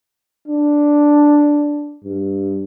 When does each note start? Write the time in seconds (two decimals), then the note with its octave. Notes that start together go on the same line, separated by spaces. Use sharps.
0.48 D4
2.03 G2